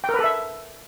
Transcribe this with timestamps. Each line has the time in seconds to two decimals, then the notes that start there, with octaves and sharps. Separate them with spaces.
0.04 G5
0.09 A#4
0.14 B4
0.19 A4
0.24 E5